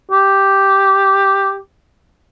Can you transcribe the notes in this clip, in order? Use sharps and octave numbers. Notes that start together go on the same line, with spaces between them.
G4